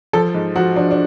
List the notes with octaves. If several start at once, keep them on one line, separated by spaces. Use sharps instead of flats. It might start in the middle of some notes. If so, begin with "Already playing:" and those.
F3 A4
G#2
F3 F#4
F3 D4
D4